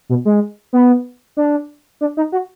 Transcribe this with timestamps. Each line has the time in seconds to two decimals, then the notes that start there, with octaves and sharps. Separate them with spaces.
0.09 B2
0.25 G#3
0.73 B3
1.37 D4
2.01 D4
2.17 D#4
2.32 F#4